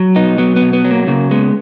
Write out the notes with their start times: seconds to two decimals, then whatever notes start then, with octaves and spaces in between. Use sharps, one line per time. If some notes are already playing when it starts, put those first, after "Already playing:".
Already playing: F#3
0.15 B2 B3 D#4
0.38 F#3 B3
0.56 B3
0.61 B2
0.73 B3
0.85 F#3
0.91 A#3
1.07 C#3 A#3
1.31 G#3 B3